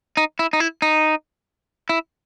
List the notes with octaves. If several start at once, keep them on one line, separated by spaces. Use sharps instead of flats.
D#4
E4
D#4
E4
D#4
E4